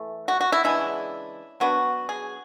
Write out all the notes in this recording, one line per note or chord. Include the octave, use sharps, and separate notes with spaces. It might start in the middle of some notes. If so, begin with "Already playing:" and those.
Already playing: E3 A3
F#4
F#4
E4
C#3 E3 G#3 D4 E4
F#3 B3 D4 F#4
G#4